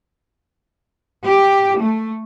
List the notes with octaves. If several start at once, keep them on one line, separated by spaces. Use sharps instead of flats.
G4
A3